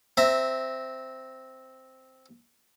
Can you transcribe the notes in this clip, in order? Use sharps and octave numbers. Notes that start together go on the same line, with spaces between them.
C4 E5 A#5